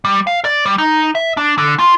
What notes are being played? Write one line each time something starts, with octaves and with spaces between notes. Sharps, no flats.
G3
F5
D5
G3
D#4
E5
D4
D3
F4